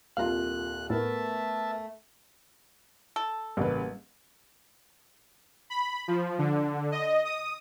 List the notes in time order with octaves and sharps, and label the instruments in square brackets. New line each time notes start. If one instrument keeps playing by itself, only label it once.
[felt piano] D#1 C2 F4 [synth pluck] F5 A#5 [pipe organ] F#6
[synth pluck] A2 [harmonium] A3 [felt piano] B3 A#4 [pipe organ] E5 A5
[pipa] A4
[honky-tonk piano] A1 C#3 B4 [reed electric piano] G3 A#3
[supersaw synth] B5
F3
D3
D#5
D#6